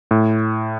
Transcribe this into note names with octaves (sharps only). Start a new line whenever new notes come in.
A2